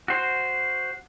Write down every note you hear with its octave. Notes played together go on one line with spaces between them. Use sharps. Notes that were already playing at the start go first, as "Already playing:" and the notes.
F#4 C5